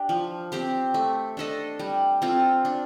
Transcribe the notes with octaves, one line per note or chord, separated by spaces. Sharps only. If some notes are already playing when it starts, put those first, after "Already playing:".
Already playing: D4 G4
F3
C4 G4 C5
A3
D4 A4 D#5
G3
C4 F4 A4
D4